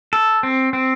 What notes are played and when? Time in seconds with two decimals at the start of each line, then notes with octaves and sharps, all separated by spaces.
0.13 A4
0.43 C4
0.73 C4